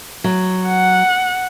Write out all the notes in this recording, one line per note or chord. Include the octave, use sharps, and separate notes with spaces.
F#3
F#5